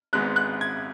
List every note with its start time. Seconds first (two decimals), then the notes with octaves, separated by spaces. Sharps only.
0.13 G#1 G#2 G#3 B3 F#6
0.36 F#6
0.61 G#6